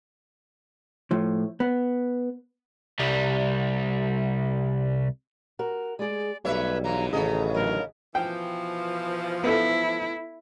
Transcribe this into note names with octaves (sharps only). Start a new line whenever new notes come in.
A2 F3
B3
C2 G3
F#4 A#4
G#3 G#4 D5
B1 G3 A3 B4 C#5 E5
E2 G2 E3 A#5
A1 D#2 C#3 G#4 A4 D#5 A#5
D3 F#3 A#4
B2 E3 F3 G5
B3 E4 A4